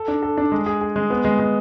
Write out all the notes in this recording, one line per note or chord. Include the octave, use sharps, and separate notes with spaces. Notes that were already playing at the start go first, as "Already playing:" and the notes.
Already playing: A4
D4
A4
D4
G#3
G#4
G#4
G#3
B3
G#3
G#3